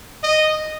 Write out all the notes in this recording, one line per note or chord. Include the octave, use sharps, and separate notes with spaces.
D#5